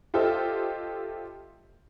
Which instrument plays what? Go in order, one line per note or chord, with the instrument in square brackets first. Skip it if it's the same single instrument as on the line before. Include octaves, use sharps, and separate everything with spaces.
[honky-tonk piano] F4 G4 A4 C5 D#5 E5